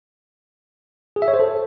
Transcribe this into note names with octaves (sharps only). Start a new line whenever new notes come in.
G#4
E5
C#5
C5
A4